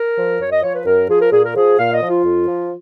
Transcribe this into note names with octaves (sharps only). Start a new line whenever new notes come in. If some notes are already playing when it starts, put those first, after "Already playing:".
Already playing: A#4
F3
F#2 C#5
D#5
F3 C#5
B4
F#2 A#4
F3 G#4
A#4
A#2 G#4
A#4
F3 G#4
A#2 F5
D#5
F3
F4
F2
F3